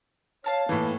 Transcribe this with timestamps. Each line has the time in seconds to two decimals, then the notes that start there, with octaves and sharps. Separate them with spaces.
0.44 C#5 F5 A5 F6
0.69 A2 E3 A#3